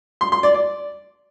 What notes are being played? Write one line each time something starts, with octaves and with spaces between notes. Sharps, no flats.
C6
C6
D5
D5